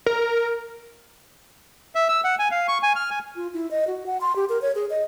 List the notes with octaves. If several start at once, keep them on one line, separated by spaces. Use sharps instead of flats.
A#4
E5
E6
F#5
G#5
F5
C#6
G#5
F6
G#5
F4
E4
D#5
F#4
F#5
C6
G4
A#4
C#5
G#4
D#5